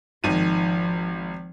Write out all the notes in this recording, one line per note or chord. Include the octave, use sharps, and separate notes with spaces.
G#1 D#3 F3 D#7